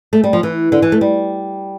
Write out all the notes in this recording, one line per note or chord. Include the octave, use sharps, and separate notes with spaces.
A3
G3
F3
E3
D3
E3
A3
G3